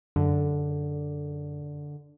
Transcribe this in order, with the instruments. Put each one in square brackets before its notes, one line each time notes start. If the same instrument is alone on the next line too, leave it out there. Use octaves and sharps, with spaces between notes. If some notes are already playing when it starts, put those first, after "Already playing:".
[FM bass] F#2 [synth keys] D3